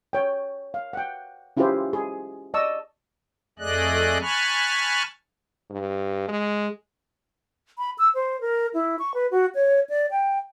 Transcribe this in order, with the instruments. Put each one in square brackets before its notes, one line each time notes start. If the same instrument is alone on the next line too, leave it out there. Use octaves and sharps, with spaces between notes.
[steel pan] C#5 G5
F5
F#5 G5
C#4 E4 F4 G4 G#4 C5
G#4
D5 D#5 A5 C#6 E6
[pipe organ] F2 A3 G#4 D5 D#5 F#6
G#5 A5 B5 C#6 F6 F#6
[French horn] G2
G#3
[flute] B5
E6
C5
A#4
E4
C#6
B4
F#4
C#5
D5
G5